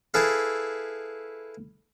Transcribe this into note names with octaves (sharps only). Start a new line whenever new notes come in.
E4 G#4 A4 B4 F5